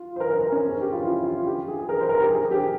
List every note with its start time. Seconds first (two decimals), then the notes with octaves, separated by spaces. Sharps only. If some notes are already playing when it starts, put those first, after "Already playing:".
Already playing: F4
0.16 C5
0.20 A#4
0.31 A#4
0.41 A#4
0.52 C#4
0.68 G#4
0.81 G4
0.92 F4
1.05 E4
1.25 F4
1.46 G4
1.68 G#4
1.79 G#4
1.89 A#4
2.00 C5
2.09 A#4
2.20 G4
2.30 G#4
2.51 G4